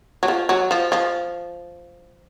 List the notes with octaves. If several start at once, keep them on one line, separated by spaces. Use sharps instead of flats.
F#3
F3
F#3
F3
F3